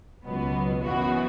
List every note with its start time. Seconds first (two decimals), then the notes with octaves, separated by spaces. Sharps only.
0.25 C#2 B2 F#3 B3
0.81 F#2 E3 B3 F#4